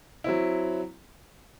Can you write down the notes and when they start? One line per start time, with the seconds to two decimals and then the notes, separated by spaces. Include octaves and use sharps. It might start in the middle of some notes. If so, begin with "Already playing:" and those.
0.24 F#3 C4 E4